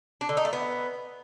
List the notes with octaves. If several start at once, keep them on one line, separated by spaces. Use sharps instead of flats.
D4
D3
D#4
A3
B3